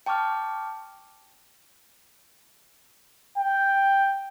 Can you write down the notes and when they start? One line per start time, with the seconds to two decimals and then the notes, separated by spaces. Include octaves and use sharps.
0.06 G5 A5 C#6 D6 F6
3.38 G5